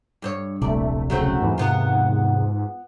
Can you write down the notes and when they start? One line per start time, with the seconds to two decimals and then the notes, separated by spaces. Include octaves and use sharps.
0.22 G2 C5 C#5
0.62 D1 A#1 C3 A3 D5
1.10 C#3 F#3 A3 C4
1.42 E2 G#2 E3
1.58 E2 G#2 C3 D#3 B3 F4